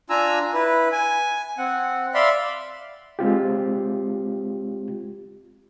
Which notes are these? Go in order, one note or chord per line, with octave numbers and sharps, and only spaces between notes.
D4 F4 G#5 A#5 E6
E4 B4
G#5
C4 F#5
D5 E5 F5 B5 C6
G#3 C4 F4 G4